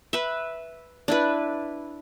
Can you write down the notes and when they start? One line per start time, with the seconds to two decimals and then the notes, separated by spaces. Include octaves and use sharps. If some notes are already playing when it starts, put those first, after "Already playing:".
0.13 B4 E5
1.08 D4 E4 B4